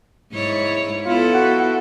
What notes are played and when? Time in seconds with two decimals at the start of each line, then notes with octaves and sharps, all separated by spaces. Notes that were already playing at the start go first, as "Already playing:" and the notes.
0.32 G#2 E4 C#5
1.06 B3 E4 F4 A4
1.34 F#4